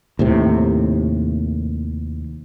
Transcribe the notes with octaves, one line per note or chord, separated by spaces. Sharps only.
D#2 A2 C3